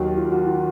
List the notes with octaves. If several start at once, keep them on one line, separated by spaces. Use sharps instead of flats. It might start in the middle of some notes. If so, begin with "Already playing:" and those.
Already playing: D#2 D#3 F#3
F4
F#4
F4